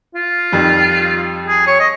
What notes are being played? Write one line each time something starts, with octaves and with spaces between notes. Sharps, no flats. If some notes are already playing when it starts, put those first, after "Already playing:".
F4
F2 D#3 G3
G#4
C#5
D#5